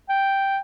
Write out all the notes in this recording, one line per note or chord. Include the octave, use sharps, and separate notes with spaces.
G5